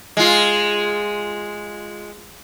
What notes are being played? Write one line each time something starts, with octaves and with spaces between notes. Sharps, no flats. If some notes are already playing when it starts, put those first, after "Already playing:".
G#3 F4